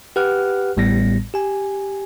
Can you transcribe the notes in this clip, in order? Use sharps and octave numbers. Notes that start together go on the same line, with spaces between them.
G4 B4 F#5 F6 F#6
A1 A2 G3 B3 A#6
G4 G#5